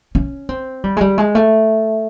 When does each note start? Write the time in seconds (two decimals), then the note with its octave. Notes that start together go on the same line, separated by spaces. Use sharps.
0.15 C#4
0.49 C4
0.84 G3
0.97 G#3
1.01 G3
1.18 G#3
1.35 A3